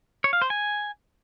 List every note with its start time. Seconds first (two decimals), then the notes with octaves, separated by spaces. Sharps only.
0.24 C#5
0.33 F5
0.42 C5
0.50 G#5